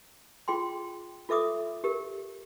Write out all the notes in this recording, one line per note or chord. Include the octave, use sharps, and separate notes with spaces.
F4 G#4 G5 C6
F4 A4 E5 D6 D#6
G4 A#4